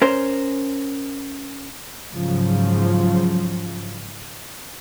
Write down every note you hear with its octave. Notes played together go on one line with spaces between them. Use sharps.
C#4 A#4 C5
G#2 C#3 F3 F#3